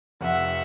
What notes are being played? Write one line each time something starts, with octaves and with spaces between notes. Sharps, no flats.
F1 E5 F#5